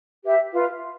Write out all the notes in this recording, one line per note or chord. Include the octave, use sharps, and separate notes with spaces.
G4 B4 E5
F4 B4 F5